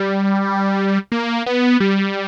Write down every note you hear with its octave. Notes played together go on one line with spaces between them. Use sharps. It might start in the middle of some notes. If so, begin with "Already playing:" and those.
Already playing: G3
A#3
B3
G3